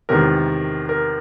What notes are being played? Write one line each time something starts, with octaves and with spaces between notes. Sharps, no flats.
E2 C3 D#3 G#3 A#4
A#4